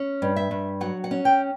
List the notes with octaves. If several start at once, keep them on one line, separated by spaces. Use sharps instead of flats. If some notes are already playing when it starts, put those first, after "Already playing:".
Already playing: C#4
G2
E5
G2
F#3 F#5
F#5
C#4
G5